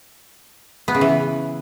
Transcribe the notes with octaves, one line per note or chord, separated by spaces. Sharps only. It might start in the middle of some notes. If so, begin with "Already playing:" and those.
B3
C#3
E3